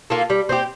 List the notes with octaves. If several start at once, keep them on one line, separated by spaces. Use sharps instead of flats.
A#3 F4 A4
G3
C4 G4